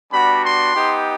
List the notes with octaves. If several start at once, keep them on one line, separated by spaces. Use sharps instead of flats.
G3 B3 D4 F#4 B5
C6
B3 D#4 G4